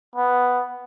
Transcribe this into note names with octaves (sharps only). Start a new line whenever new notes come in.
B3